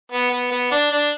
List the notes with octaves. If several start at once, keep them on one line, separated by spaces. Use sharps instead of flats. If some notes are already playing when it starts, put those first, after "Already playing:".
B3
B3
B3
D4
D4